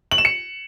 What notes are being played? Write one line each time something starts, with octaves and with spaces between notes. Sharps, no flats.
F#7
E7
C#7